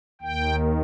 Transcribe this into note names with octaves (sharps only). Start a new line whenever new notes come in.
D#2 D#3 G5